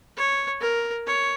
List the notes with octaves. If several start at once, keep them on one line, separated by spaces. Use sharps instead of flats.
C#5
A#4
C#5